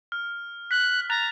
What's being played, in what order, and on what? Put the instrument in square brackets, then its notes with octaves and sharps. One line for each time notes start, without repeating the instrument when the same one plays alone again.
[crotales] F6
[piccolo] F#6 [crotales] B6
[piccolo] A#5 [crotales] F#6 A6 F7